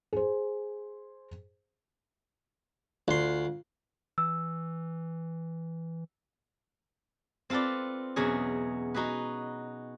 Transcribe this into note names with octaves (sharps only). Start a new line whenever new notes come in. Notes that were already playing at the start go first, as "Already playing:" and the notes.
G#4 C5
D2 F4 C6
E3 E6
C4 F4 A4 B4 D5
E2 B2 F#3 C#4 G#4
D#4 F#4 G#4 B4